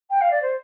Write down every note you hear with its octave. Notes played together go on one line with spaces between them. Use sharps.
G5
F5
D5
C5